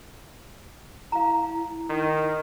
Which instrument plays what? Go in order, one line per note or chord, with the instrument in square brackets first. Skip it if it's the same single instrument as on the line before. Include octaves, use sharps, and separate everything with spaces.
[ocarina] E4 [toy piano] F5 A#5
[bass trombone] D#3